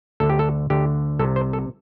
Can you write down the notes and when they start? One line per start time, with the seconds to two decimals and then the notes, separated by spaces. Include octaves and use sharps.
0.20 D2 D3 A4
0.30 G4
0.39 A4
0.70 D2 D3 G4
1.19 C2 C3 A4
1.36 C5
1.53 A4